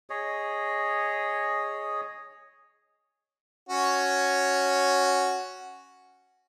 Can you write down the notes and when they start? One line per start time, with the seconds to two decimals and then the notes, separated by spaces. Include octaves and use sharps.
0.10 G#4 C#5 D#5
3.69 C#4 F#4 C#5